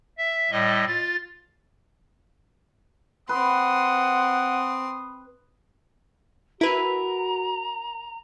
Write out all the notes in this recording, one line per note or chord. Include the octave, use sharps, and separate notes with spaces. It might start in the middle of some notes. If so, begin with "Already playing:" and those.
E5
A2 G3 D#5
F4 A6
C4 B4 F#5 C6 D#6
E4 F#4 A#4 B4 A#5 B5